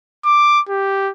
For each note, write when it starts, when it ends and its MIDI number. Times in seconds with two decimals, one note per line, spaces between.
0.25 0.61 86
0.69 1.11 67